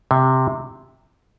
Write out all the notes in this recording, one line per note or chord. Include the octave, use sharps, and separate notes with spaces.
C3